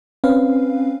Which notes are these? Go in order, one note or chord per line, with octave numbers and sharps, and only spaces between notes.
C4 C#4 B4 F5